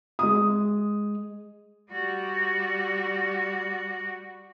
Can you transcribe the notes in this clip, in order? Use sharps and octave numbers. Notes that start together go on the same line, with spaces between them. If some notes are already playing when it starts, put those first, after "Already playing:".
G#3 D#6
G3 F#4